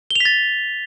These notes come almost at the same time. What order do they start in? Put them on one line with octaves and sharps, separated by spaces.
G7 F7 B6 A6